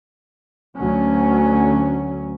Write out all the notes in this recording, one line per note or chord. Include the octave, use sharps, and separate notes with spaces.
D2 F#3 C#4